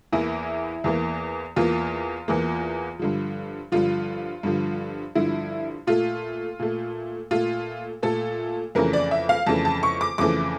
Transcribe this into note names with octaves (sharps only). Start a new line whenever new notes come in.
E2 E3 A#3 E4
E2 E3 A#3
E2 E3 A#3 F4
E2 E3 A#3
G2 D3 F3
G2 D3 F3 F4
G2 D3 F3
G2 D3 F3 E4
A#2 A3 F4
A#2 A3
A#2 A3 F4
A#2 A3 A4
F2 C#3 E3 A3 A#4
D5
E5
F5
F2 C#3 E3 A3 A5
A5
C#6
D6
F2 C#3 E3 A3 D6